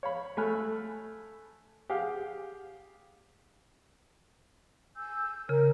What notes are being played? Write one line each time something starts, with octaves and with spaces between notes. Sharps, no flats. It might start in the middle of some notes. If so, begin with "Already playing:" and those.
C#5 F5 B5
A3 A4 G#5 B5 F6 F#6
G4 G#4 F5 F#5
G#5 E6 G6
C#3 A#4